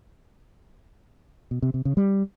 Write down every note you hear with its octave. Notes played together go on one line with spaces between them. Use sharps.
B2
C3
C3
C#3
G3